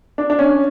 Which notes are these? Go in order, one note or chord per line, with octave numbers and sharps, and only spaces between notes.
D4
D4
C#4